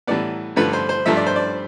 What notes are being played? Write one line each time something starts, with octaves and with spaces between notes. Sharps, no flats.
A2 E3 G3 B3 D5
G2 D3 F3 A3 B4
C5
C5
G2 F3 A3 E5
D5
C5
D5